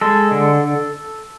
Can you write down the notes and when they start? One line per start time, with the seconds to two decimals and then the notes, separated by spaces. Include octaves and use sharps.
0.01 G#3 A4
0.31 D3